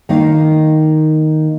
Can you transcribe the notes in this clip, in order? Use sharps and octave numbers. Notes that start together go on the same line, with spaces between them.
D#3 A#3 D#4 F5